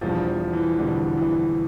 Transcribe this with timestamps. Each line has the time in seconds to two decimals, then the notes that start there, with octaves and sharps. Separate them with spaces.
0.01 E2 B2 F3 G3 D4
0.27 F3
0.53 E3
0.79 E2 B2 D3 G3 D4
1.17 E3